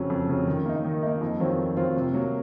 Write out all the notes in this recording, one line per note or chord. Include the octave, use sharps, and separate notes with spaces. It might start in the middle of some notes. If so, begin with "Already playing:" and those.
Already playing: F2 C#3 F#3
F2
C#3 F#3
D#3
A#3 D#4
D#3
A#3 D#4
F2
D#3 F#3 C4 F4
F2
D#3 F#3 C4 F4
C3
F#3 A#3